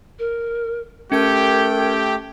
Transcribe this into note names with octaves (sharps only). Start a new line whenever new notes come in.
A#4
A3 C#4 G4 A#4 G5 G#6
G4